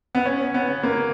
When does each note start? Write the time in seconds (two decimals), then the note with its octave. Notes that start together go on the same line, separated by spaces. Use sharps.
0.15 B3
0.25 C#4
0.54 B3
0.83 A#3